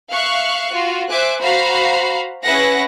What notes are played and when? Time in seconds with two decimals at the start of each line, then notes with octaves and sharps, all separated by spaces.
0.12 E5 F5 C#6 F#6
0.71 F4 F#4
1.09 C5 E5 G#5 D6 F#6
1.41 F#4 C5 F5 A#5 B5 C7
2.44 C#4 E4 G#4 B4 F#5 A#6